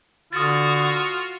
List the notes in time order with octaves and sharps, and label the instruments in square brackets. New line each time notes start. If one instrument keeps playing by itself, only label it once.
[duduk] D3 [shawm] F4 [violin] F#4 [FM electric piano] D#6 A6